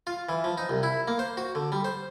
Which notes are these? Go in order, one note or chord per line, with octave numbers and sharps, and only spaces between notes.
F4
E3
F3
D#4
C2
E4
A#3
C5
F#4
D3
G3
C5